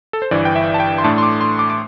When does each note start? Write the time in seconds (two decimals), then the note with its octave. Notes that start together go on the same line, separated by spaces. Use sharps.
0.13 A4
0.22 C5
0.31 G1 G2 E3 D5
0.45 G5
0.56 E5
0.74 A5
0.80 G5
0.98 C6
1.04 A2 A3 D4 A5
1.18 C6
1.23 D6
1.41 C6
1.59 D6
1.70 D6